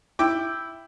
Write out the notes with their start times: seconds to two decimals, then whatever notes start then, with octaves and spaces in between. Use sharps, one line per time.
0.19 E4 G5 D6